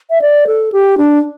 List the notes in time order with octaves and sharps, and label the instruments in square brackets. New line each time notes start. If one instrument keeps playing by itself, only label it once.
[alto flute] E5
D5
A4
G4
D4